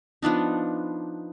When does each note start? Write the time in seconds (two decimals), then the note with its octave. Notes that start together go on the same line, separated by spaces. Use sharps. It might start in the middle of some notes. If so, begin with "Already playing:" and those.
0.22 F3 B3 D4 D#4